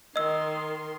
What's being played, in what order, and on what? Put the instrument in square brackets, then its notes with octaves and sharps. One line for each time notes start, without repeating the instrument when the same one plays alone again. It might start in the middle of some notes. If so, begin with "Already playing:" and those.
[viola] D#3 C6 [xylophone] D#5 E6